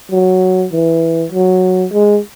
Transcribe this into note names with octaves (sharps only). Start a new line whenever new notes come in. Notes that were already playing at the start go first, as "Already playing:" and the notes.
F#3
E3
F#3
G#3